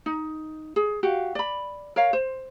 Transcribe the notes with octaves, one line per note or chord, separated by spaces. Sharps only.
D#4
G#4
F#4 G4 F5 F#5
D5 B5
A#4 C#5 F5
C5